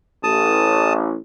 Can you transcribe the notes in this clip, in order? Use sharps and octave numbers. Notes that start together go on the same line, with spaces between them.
A1 A5 D#6